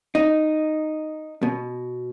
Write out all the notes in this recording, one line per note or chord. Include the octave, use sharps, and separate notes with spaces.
D#4
B2